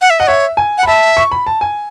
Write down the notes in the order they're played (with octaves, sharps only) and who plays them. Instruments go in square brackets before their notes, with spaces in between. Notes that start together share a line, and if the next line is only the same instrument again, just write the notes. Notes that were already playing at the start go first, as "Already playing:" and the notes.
[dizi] F#5
E5
[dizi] D#5 [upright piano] F#5
[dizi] C#5 [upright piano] E5
[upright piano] G#5
[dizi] F#5
[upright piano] B5
[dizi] E5 [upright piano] A5
[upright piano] C#6
B5
A5
G#5